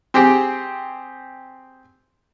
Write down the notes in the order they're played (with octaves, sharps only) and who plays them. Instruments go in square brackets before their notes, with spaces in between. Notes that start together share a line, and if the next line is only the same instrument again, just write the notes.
[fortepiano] C4 G4 G#4 G5